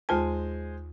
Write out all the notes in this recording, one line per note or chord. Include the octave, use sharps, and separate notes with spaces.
D#2 G#3 F4 C5 G#5 A5